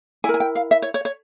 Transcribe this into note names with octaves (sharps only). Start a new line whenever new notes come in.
E4 A#4 G#5
G#5
G5
F5
E5
C#5
C#5
C#5